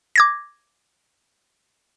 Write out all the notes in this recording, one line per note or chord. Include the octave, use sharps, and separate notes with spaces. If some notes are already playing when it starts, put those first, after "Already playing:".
D6 G#6 A#6